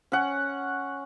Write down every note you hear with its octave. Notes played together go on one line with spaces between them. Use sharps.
C#4 F#5